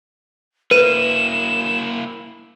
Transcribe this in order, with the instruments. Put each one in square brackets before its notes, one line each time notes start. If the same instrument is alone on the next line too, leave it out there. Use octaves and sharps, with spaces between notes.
[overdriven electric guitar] A#3 E4 [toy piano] B4 [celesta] D#7 [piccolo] E7